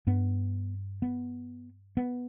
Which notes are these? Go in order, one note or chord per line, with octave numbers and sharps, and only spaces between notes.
G2 B3
B3
B3